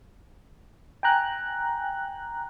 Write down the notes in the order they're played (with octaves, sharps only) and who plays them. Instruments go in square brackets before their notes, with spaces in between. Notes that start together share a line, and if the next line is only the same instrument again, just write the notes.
[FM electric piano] G5 G#5 A#5 F#6